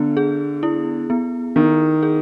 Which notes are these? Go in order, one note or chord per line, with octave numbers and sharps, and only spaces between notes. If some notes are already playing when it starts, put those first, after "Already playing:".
Already playing: D3 B3
G#4
E4
B3
D#3 B3
G#4